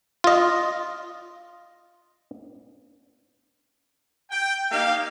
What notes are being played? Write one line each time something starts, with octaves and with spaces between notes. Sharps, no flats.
F4 D#5
G5
A#3 D#4 G4 F5